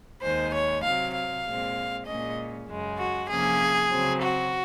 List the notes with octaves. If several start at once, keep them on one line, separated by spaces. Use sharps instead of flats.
D#2 D#3 G#3 C5
C#5
C3 F#3 C4 F5
F5
A#2 G#3 C4
A#2 G#3 C#4 D#5
F#2 C#3 G#3
F#4
C3 F3 A#3 C#4 G#4
C#3 F#3 C4
F#4